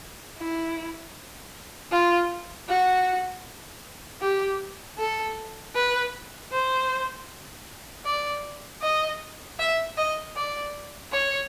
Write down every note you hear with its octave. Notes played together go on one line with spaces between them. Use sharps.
E4
F4
F#4
G4
A4
B4
C5
D5
D#5
E5
D#5
D5
C#5